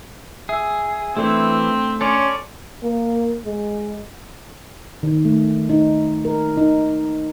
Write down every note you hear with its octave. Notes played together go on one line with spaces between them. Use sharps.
G#4 E5 E6
E3 A3 C4 D4 E4
C#4 A4 C#5 D5 C6
A#3
G#3
D#3
A3
D#4
A#4
D#4